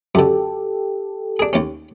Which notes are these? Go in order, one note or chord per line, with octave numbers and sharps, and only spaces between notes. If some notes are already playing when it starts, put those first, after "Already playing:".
F#2 D3 G4 A4
D4 G#4
D#2 C#4